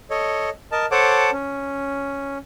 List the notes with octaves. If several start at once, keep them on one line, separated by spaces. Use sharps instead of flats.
A4 C#5 D#5
A#4 D#5 A5
A4 C5 C#5 F#5 A5 D6
C#4